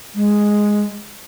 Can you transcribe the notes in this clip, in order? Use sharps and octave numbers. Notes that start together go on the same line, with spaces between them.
G#3